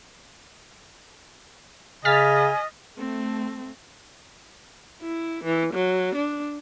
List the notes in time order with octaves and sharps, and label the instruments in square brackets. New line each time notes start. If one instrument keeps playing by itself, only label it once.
[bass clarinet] C#3 [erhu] D#5 [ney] G#5 [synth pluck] F6 A6 B6
[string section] A3 [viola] C4
[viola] E4
E3
F#3
D4